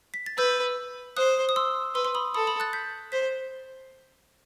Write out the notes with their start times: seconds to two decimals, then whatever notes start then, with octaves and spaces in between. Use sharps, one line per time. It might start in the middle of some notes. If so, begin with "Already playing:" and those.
0.14 B6
0.26 A6
0.38 B4 E6 G6
1.16 C5 D#6 F#6
1.49 D#6
1.56 C6 E6
1.95 B4 C6 E6
2.05 C6
2.15 B5 D#6
2.34 A4 B5 D#6
2.47 B5 D#6
2.60 F#6 A6
2.73 G6 B6
3.12 C5 G6 B6